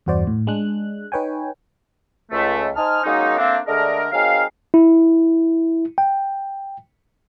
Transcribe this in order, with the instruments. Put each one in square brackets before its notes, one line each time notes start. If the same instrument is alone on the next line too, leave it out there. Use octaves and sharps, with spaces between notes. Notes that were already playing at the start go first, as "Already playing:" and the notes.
[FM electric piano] E2 G2 F#4 C5 D5
A2
G#3 D4 F#6
D#4 B4 C#5 G5 G#5
[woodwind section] C#2 A3
D#4 C5 G#5 A5 D#6 F6
D#3 F#3 G#3 A#3 C#4 D#4
A3 A#3 C4 D4
D3 G#3 A3 D4 G#4 A#4
F#3 C4 D#4 G#4 A#4 F5
[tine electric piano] E4
G5